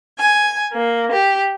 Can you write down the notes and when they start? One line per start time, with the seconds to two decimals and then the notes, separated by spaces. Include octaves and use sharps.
0.18 G#5
0.72 A#3
1.11 G4